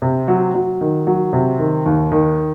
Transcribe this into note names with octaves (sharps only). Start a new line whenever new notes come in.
C3
F#3
F#3
D#3
F#3
C3
D#3
D#2
D#3